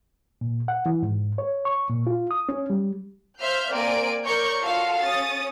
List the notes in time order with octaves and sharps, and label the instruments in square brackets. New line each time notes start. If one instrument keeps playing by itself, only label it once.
[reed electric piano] A#2
F#5
E3
G#2
C#5
C#6
A#2
F4
D#6
C#4
G3
[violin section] C5 E5 F5 F6 G6
A#3 C4 A#4 D5 G#5 D7
A#4 C#5 D5 C#6 G6
F4 F#4 A4 F5
C#4 D#6 A6